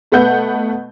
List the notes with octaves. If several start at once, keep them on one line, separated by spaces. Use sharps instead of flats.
B2 A3 B3 B4 F#5 G6